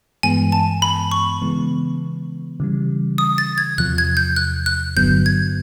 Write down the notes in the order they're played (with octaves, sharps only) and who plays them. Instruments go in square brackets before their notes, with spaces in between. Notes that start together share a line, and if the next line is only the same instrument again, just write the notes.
[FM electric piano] G2 E3 G#3 B3 [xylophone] G#5
[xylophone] A5
B5
C#6
[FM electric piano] C#3 E3 G#3 B3
C#3 E3 G3
[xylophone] D#6
A6
G#6
[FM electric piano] E2 C3 F3 [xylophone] F#6
[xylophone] G#6
G6
F#6
F#6
[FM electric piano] G1 G2 D3 F#3 B3 [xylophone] G6
[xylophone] G#6